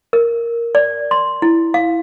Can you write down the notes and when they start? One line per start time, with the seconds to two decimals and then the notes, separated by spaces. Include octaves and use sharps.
0.13 A#4
0.75 D5
1.11 C6
1.42 E4
1.74 F5